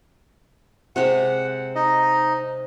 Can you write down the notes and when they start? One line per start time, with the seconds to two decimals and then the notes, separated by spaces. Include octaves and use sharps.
0.96 C3 G#3 G4 F#5
1.75 D#4 D#5